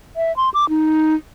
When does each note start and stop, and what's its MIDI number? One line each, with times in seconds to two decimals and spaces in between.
0.16 0.35 76
0.37 0.49 84
0.54 0.68 86
0.69 1.15 63